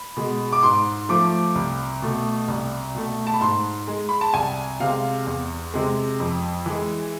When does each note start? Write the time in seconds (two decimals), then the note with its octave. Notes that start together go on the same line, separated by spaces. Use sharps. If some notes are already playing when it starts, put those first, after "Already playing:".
Already playing: B5
0.17 B2 G#3
0.53 D6
0.63 G#2 C6
1.09 F3 A3 D6
1.55 C2
2.02 B2 A3
2.48 C2
2.95 B2 A3
3.27 A5
3.34 B5
3.41 G#2 C6
3.88 G#3
4.09 B5
4.21 A5
4.34 C2 G#5
4.80 C3 G#3 F5
5.27 E2
5.74 C3 G#3
6.20 F2
6.66 E3 G#3